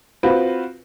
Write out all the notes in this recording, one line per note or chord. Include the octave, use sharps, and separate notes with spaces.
C4 F4 F#4 B4